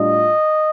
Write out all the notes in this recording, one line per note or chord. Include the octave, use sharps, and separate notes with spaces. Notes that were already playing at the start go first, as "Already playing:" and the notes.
Already playing: A2 G3 D4 F4 D#5